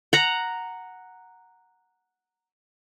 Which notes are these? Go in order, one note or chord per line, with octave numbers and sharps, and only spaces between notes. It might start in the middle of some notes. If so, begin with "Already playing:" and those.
F#5 A#5